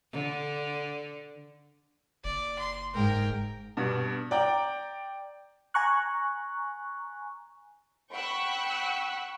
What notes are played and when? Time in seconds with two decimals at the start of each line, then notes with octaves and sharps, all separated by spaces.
0.13 D3
2.24 F#1 D5
2.59 C6
2.94 G#2 A#4 G5
3.77 G2 B2
4.31 D5 G5 A#5
5.74 G#5 A#5 C#6 F#6
8.14 F#5 G5 B5 C#6 E6 F#6